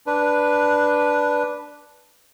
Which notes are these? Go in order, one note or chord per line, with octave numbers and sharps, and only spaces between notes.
D4 B4